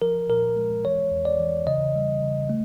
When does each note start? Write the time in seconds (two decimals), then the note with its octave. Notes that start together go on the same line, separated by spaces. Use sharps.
0.02 F3 A#4
0.29 A#2 A#4
0.56 G#3
0.84 E3 C#5
1.11 E2
1.25 D5
1.39 E3
1.67 C#3 D#5
1.95 G3
2.22 C#3
2.50 A3